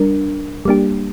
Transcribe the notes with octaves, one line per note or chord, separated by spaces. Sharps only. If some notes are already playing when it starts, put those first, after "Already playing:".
Already playing: G3 D4 A#4
G3 A#3 D4 G4